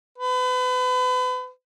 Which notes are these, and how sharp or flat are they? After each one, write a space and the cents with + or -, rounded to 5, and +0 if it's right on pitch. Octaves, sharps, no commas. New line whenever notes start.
B4 +35